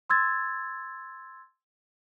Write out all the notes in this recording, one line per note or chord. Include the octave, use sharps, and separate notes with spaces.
C6 E6 G#6 A6